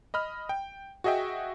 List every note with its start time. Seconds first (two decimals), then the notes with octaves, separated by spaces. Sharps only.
0.14 D#5 B5 F6
0.49 G5
1.04 F#4 G#4 D#5 E5 G5